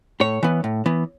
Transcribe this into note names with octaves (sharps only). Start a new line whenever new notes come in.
A2 C#5
E3 B3
A2
E3 B3